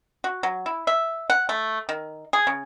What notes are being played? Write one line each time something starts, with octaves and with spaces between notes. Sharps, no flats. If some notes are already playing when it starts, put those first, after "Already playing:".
F#4
F#3
E4
E5
F#5
A3
D#3
G#4
C#3